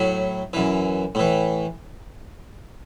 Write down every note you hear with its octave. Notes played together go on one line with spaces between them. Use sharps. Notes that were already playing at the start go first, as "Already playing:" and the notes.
Already playing: A2 F#3
F#2 E3
A2 E3